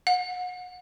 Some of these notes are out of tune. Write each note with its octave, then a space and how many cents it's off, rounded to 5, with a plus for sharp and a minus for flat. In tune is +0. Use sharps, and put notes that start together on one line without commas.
F#5 -35